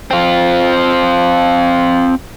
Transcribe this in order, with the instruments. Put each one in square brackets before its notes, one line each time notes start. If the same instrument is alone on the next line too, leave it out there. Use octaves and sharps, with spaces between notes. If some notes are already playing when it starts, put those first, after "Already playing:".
[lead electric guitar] C4 F4